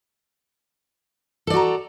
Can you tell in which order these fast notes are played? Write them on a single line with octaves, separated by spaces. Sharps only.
A4 D5 F#4 A#5